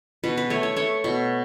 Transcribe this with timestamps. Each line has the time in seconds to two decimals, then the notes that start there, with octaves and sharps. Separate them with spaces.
0.24 B2 B4
0.37 B4
0.50 A3 C#5
0.63 C#5
0.76 A3 C#5
1.04 B2